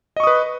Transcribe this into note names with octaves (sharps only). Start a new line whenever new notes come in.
B4 D#5 C#6 D#6